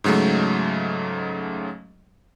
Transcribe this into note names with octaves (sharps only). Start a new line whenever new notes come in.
G#2 C#3 F#3 G#3 A3